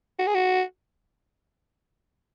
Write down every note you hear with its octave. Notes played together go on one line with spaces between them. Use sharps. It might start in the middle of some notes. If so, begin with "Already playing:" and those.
F#4
G#4
F#4